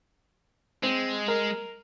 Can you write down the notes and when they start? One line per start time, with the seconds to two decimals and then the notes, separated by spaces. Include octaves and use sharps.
0.83 G#3 C4
1.28 A#4